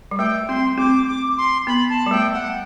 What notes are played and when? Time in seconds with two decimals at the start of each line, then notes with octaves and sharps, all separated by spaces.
0.11 G3
0.18 A3 G5
0.48 C4 C6
0.78 C4 D6
1.08 D6
1.37 C6
1.67 B3 B5
1.90 A5
2.06 G3
2.11 A3 G5
2.34 F#5